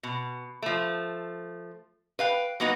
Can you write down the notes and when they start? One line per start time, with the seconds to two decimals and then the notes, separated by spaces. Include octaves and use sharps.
0.03 B2
0.62 F3 A3
2.19 B4 F5 G5
2.60 F#3 A#3 B3 D#4 F#4